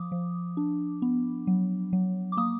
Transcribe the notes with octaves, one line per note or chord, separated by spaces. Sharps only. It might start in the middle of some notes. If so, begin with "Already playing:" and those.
Already playing: F3 D6 D#6
F3
D4
B3
F#3
F#3
D6
A#3 D#6